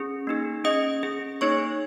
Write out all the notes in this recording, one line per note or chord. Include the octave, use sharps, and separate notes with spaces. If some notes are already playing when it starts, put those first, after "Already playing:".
Already playing: C#4 G#4
A#3 D#4 G#4
C#4 G#4 D#5 D#6
C#4 G#4
A#3 D#4 G#4 C#5 C#6